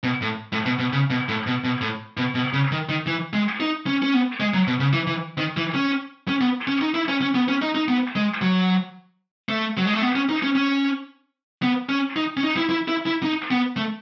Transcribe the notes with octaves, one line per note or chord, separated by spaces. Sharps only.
B2
A2
A2
B2
B2
C#3
B2
A2
B2
B2
A2
B2
B2
C#3
D#3
D#3
E3
G#3
D#4
C#4
C#4
B3
G#3
F#3
B2
C#3
E3
E3
D#3
E3
C#4
C#4
B3
C#4
D#4
E4
C#4
C#4
B3
C#4
D#4
D#4
B3
G#3
F#3
A3
F#3
G#3
A3
B3
C#4
D#4
C#4
C#4
B3
C#4
D#4
C#4
D#4
E4
E4
E4
E4
D#4
B3
A3